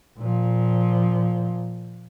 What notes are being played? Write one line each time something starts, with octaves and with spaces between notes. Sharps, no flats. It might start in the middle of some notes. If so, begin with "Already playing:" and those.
A#2 F3